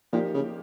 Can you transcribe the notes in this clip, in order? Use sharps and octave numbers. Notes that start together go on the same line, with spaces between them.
A#2 F3 A#3 D#4 G4 A#4
C#3